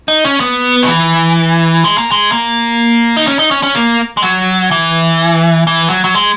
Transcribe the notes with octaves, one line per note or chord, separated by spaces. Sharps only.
D#4
C#4
B3
D#3
E3
G#3
A#3
G#3
A#3
D#4
C#4
D#4
C#4
C#4
A#3
G#3
F#3
E3
E3
F#3
F#3
G#3